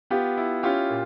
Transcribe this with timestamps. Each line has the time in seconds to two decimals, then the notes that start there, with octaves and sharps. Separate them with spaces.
0.10 B3 F4 G4
0.37 E4
0.63 C#4 F4 G4
0.90 A#2